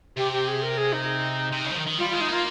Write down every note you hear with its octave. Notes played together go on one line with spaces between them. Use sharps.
C3 G4
G4
G#4
A#4
G#4
D#4
C3
C#3
F3
D#3
D#3
G3 F4
G#3 F4
D#4
A#3 F4